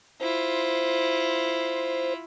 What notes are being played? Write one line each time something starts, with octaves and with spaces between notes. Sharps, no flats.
E4 F4 C5